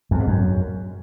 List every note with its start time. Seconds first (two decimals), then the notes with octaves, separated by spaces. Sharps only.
0.11 E2
0.19 G#2
0.28 F#2